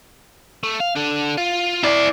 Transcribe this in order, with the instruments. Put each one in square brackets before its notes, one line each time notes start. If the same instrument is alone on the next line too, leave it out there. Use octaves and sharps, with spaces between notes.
[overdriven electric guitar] A3
F5
D4 A4
F4
[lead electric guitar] E4 D5